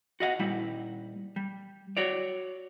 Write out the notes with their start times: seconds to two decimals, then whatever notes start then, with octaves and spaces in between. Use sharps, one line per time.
0.20 F#4 D#5 F5 F#5
0.39 A#2 G3 E4
1.36 G3
1.97 F#4 C#5 D5